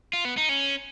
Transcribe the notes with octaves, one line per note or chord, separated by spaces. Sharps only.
F4
B3
D#4
C#4